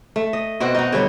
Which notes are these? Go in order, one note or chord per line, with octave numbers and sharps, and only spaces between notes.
A3
D#5
B2 C4 F#4
D#4 F#4
D3 G3 C#5